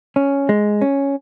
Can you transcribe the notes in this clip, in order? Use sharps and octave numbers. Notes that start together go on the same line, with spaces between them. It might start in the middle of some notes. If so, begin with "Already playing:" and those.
C#4
G#3
C#4